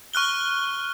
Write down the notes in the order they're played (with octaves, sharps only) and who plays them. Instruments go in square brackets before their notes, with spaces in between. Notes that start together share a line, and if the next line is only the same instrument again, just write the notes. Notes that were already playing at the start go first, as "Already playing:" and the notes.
[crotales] C#6 F6 F#6 G7